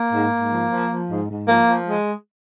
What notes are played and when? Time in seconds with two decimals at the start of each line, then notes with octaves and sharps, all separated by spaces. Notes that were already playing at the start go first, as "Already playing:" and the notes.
Already playing: A#3
0.13 G#2
0.32 G#2
0.52 F3
0.71 F3
0.90 F3
1.10 G#2
1.29 G#2
1.48 F3 A#3
1.67 F3
1.87 G#3